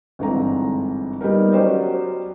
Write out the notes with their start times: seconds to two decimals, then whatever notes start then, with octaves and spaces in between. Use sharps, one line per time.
0.19 G1 G#2 D3 E3 C4 A#5
1.21 G3 B3 D#4 A#4
1.52 F#3 C#4 G4 C5 D5 D#5